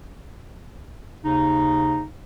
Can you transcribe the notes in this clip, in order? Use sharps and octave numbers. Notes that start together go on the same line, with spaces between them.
D#2 C#3 D#4